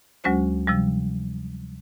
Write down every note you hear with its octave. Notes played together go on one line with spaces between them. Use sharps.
D2 F#3 G#3 C#4 F#4 C5
C3 F3 G3